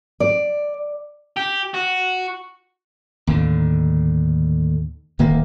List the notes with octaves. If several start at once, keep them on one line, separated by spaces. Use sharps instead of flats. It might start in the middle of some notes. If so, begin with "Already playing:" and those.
D5
G4
F#4
D#2 A2 D3
D1 D#3 A#3